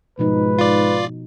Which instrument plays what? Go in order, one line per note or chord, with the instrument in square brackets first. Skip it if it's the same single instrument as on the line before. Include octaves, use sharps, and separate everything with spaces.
[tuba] G#2 [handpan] B2 F3 D#4 [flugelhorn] B4
[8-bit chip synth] F4 D5